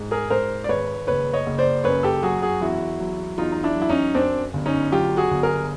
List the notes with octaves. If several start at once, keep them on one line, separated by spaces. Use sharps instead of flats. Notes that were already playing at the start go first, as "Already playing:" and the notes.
Already playing: G#2
G#4 A#4
G#2 A#4 C5
D5
G#1 B4 C#5
F#1 B4 C#5
C#5 D#5
F#1
C5 D5
F#2 B4 C#5
G4 A4
F#3 F#4 G#4
F#4 G#4
E2 E4 F#4
F#3
E2 D#4 F4
D#4
D4 E4
F#3
E4
C#4 D#4
F#2 C4 D4
G1
C#4 D#4
F#3 F4 G4
F#4 G#4
G1
G#4 A#4